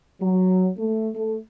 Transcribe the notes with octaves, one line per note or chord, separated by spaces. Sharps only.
F#3
A3
A3